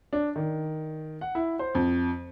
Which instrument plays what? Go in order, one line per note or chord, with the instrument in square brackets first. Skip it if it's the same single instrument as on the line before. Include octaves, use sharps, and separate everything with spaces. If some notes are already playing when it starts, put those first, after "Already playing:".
[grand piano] D4
D#3
F#5
E4
C5
F2